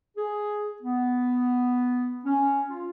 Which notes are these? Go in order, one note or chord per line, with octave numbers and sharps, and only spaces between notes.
G#4
B3
C#4
F4